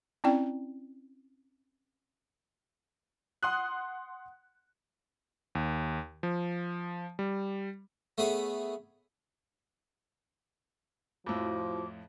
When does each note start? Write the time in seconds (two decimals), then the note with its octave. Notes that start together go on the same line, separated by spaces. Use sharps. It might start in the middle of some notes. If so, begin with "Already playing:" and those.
0.24 C4 C#4 E4 D5 G5
3.43 F#5 C6 D#6 F#6
5.55 D#2
6.23 F3
7.19 G3
8.18 A3 B3 G#4 C#5
11.26 F2 A2 F3 E4 F#4 D6